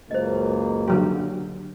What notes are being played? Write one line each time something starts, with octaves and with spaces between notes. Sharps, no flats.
C#2 F#2 A#3 C5 D#5
D3 F#3 G4